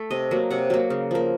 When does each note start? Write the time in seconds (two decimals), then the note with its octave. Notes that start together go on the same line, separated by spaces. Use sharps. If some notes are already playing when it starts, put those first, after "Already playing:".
Already playing: A3
0.11 C3 D#5
0.31 F#3 A#3
0.51 C3 F#5
0.70 F#3 A#3
0.90 C#3
1.11 F3 A#3